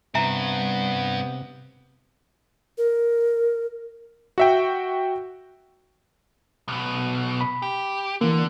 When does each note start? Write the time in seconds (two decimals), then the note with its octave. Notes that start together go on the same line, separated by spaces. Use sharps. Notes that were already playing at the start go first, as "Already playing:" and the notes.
0.15 G2 C3 B3 E5 A#5
2.78 A#4
4.38 F#4 E5 G5
6.68 B1 B2
7.41 B5
7.62 G4
8.21 D3 E3 A#3